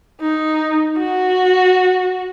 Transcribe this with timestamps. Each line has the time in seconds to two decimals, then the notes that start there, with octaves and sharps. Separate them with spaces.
0.21 D#4
0.98 F#4